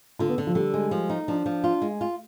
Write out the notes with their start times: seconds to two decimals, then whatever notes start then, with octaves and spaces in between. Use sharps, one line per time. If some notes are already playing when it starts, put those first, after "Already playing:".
0.19 D3 F4
0.29 B3
0.38 D3
0.47 F3
0.55 D3 G3
0.74 G#3
0.91 F3
1.09 D#4
1.28 F3 D4
1.46 F3
1.64 F4
1.82 G#3
2.01 F4